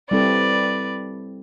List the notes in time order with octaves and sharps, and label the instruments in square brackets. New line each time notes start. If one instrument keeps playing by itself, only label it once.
[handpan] G3 C4 E4 A4 [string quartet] B4 D5